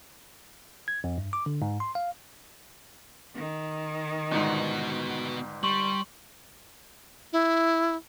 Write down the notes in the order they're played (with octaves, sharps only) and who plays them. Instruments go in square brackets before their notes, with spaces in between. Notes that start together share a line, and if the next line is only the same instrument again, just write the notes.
[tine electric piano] G#6
F2
G2
D6
D3
G#2
C6
F5
[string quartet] D#3
[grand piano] G1 G#2 [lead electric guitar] B3 F#4
[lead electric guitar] G3 [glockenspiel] C6 C#6 F#7
[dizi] E4